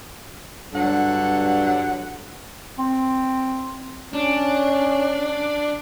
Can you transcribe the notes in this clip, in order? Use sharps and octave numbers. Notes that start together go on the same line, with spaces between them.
G2 D3 F#3 F#5
C4
C#4 D4